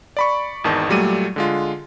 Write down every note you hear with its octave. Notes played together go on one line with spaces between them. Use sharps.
D5 B5 C#6
G#1 E2 D#3 A5
A#2 F#3 G3 A3 D#7
D3 G#3 F4